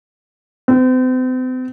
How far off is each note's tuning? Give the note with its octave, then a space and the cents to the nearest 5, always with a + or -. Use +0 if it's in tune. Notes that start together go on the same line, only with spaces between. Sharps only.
C4 -40